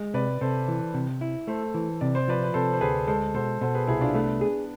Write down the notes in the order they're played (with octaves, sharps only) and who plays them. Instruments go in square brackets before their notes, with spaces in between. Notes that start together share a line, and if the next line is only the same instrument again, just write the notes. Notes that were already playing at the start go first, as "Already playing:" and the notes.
Already playing: [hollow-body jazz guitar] G#3
[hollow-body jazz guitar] C3 [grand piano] B4 D5
[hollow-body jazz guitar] C3 [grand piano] A4 C5
[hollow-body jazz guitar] E3
C3
E4
[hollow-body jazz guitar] A3 [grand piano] A4 C5
[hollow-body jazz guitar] E3
[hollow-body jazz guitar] C3 [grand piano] D5
[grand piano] C5
[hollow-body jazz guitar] F3 [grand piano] B4 D5
[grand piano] B4
[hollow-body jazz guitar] C3 [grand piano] A4 C5
[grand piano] C5
[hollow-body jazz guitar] D2 [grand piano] G#4 B4
[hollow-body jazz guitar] G#3 [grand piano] A4 C5
[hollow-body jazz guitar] B2 [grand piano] A4 C5
[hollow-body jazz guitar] B2 [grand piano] A4 C5
[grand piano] G#4 B4
[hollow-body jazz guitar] C2 [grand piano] E4 G#4
[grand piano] D4 F4
[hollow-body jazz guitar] A3 [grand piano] B3 D4
[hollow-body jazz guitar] G#4